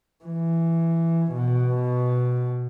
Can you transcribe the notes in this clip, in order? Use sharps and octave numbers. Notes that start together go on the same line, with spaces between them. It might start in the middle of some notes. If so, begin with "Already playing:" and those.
E3
B2